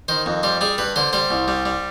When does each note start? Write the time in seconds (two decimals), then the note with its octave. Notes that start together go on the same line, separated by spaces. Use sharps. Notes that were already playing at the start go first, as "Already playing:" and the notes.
0.08 D#3 C5
0.26 F2
0.43 G3 C5
0.61 G3 G#4
0.78 G2 B4
0.96 D3 C5
1.13 G3 C5
1.31 C2
1.48 G3
1.65 G3